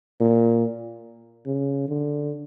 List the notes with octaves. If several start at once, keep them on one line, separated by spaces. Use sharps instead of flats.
A#2
C#3
D3